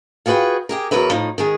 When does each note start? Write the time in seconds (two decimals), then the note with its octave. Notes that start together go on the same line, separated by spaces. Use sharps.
0.26 F4 F#4 G#4 B4 F#5 G5
0.69 G4 G#4 A#4
0.91 E2 F#3 A#4 B4 E5
1.11 A2 F3 D#4
1.38 D#3 G#3 G#4